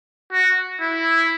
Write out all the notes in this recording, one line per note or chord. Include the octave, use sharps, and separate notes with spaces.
F#4
E4